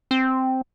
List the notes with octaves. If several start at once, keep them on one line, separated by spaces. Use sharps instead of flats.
C4